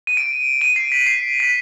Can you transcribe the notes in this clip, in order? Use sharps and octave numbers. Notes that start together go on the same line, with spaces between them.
D#7
D7
D#7
C7
B6
C7
B6